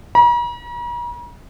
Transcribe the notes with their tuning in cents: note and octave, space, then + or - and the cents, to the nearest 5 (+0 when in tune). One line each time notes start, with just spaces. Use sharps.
A#5 +45